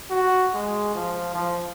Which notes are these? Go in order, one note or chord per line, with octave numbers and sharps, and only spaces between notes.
F#4
G#3
F3
F3